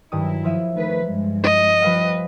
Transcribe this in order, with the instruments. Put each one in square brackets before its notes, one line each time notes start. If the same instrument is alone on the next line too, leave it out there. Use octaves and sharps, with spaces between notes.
[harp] G2 D#3 D#6 [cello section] F#3 E4
[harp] F3 E5 D#7
[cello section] D#3 A3 B4
G2 G#3
[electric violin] D#5
[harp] F3 G3 F5 [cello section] B4